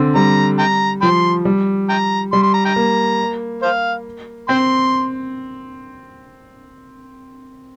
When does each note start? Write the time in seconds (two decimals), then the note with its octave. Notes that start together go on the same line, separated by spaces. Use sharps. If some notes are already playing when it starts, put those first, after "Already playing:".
Already playing: D3 C4
0.15 G3 A#5
0.59 G5 A#5
1.02 F3 G5 C6
1.45 G3
1.89 G5 A#5
2.32 G3 C6
2.43 C6
2.54 A#5
2.65 G5 A#5
2.76 A#3
3.62 C5 F5
4.49 C4 G5 C6